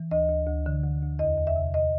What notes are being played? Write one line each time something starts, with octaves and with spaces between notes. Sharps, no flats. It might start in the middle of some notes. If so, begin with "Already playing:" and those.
Already playing: E3
D2 D#5
D2
D2
D3
D2
D2
E2 D#5
E2
E5
C3
D#5